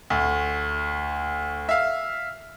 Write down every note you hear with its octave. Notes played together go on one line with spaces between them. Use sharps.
D2
E5 F5